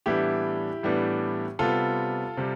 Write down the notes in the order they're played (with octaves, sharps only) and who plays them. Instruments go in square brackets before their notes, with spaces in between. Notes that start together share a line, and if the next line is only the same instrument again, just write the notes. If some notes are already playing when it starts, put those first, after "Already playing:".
[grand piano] A2 E3 G3 B3 D4 E4 G4
A2 E3 G3 B3 D4
C3 G3 B3 F4 A4
C3 G3